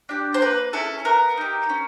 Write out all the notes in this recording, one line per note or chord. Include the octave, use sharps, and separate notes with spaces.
D4 G4
C5
A#3 B4
C#4 E4 G#4 A4
B3 A#4
D#4 G4
C#4